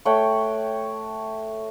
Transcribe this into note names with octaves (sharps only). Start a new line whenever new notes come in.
A3 C#5 F#5 G5